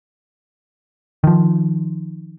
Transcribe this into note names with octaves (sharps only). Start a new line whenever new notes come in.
D#3 F3